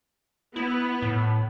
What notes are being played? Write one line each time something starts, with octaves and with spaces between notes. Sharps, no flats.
B3 E4
A2